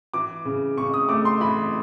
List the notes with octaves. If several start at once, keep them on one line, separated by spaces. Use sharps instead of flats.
E3 D6
C#3
C#3 C#6
D#6
A3 D6
C6
E3 B5